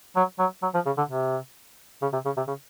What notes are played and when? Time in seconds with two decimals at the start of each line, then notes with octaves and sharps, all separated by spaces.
0.16 F#3
0.39 F#3
0.63 F#3
0.74 F3
0.86 C#3
0.98 D3
1.09 C3
2.02 C#3
2.13 C3
2.25 C#3
2.37 C3
2.48 C#3